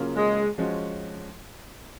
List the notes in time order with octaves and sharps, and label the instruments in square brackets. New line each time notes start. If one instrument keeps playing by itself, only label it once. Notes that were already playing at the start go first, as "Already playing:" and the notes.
Already playing: [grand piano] C#3 F#3 A#3 C#4 F4
[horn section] G#3
[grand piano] F3 G#3 C#4 F#4